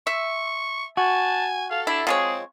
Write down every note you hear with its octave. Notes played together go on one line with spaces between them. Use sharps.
E5 C#6
F#4 G#5 A5
A4 F5
D4 E4
F3 G#3 C4 G#4 C#5